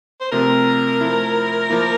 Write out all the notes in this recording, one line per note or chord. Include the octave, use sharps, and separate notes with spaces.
C5
C3 F3 A3 C4 A#4
F3 A3 E4
F3 A#3 E4